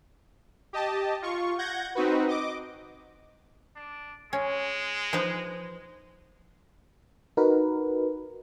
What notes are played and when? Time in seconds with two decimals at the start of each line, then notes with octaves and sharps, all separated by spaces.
0.73 G4 D#5 A5
1.22 F4 C#6
1.58 F#5 G6 G#6 A#6
1.95 C4 D#4 F#4 B4
2.28 D#5 D6
3.76 D4
4.33 G#3 C#4
5.13 F3 D#4 B4
7.37 D#4 F#4 A#4 B4